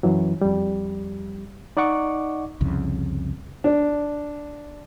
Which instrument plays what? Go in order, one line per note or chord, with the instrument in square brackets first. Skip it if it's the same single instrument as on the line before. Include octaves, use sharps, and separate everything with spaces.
[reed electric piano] F#2 E3 F#3
F2 G3
D#4 D5 D#5 F#5 C#6 D6
[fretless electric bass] C2 F2 C#3
[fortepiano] D4